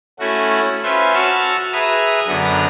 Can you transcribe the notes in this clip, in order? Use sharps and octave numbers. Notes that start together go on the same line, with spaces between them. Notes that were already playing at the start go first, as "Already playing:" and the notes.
A3 C#4 E4 F#4
C#4 F4 B4 C5 E5
F#4 A5 C#6 E6 F6
G#4 B4 E5 A#5 D#6
F#2 D3 B3 A#5 A#6